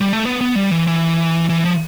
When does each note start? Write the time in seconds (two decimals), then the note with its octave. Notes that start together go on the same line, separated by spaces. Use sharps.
0.01 G3
0.13 A3
0.25 B3
0.41 B3
0.55 G3
0.71 E3
0.87 E3
1.49 E3
1.65 F3